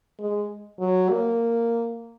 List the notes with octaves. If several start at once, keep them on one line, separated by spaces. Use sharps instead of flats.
G#3
F#3
A#3